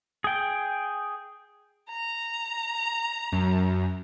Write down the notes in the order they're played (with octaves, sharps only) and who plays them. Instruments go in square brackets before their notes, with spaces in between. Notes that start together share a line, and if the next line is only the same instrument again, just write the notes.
[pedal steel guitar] G#4 G5
[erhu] A#5
[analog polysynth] F#2